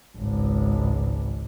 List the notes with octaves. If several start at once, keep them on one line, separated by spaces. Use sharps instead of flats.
G#1 C#2